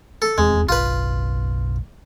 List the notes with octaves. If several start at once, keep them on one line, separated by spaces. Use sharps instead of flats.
A4
D#1 E2 G#3 C4
F#1 B1 F4 B4